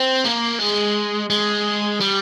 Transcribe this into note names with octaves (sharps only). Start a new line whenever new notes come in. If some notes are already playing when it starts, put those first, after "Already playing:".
Already playing: C4
A#3
G#3
G#3
G3